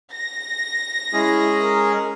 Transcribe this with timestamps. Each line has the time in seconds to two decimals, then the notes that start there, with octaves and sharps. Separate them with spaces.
0.12 A#6
1.13 G#3 C#4 E4 G#4
1.62 A#4